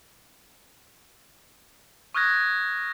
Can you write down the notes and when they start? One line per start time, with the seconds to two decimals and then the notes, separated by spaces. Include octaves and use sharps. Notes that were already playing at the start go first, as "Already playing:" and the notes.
2.14 C#6 D#6 F6 F#6 G#6 A#6